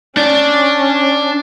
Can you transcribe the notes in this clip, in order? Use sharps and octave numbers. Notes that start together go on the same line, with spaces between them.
C#4 D4